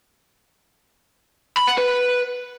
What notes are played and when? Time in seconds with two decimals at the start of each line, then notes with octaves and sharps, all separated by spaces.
1.57 B5
1.68 F#5
1.78 B4